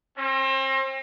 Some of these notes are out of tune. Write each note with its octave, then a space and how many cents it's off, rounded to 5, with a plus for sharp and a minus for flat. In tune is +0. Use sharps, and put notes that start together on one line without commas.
C4 +35